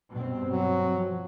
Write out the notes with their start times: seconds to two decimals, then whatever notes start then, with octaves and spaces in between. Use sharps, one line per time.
0.11 G2 B2 C4
0.51 F#3
0.92 F3